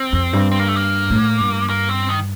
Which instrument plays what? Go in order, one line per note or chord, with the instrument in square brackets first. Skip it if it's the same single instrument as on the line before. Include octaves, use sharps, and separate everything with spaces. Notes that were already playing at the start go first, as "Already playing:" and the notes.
Already playing: [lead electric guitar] C4
[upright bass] F2
G2
[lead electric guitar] C4
A#3
A3
A#3
[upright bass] A2
G2
[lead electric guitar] A#3
C4
D#3